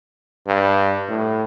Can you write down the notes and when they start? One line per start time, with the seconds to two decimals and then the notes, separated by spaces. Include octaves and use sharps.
0.47 G2
1.09 A2